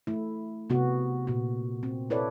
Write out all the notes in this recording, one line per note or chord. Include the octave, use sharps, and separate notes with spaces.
A3 E4
C3 B3 F#4
A#2 F#4
C4
E4 A4 B4 C#5 D5